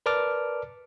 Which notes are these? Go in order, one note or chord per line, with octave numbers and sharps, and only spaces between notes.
A#4 B4 D5 A5 D6 F6